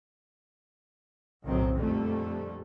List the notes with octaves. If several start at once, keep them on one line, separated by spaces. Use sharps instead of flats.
F#1 B1 A2 D#3 F#3 C4
F2 A#2 D3 G3 A3